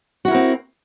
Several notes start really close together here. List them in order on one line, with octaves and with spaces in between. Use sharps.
F#4 E4 A#4 C4